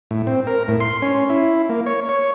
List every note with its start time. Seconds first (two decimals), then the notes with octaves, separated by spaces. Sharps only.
0.11 A2
0.27 C4
0.47 A#4
0.68 A2
0.80 C6
1.02 C#4
1.30 E4
1.69 A#3
1.86 C#5
2.09 C#5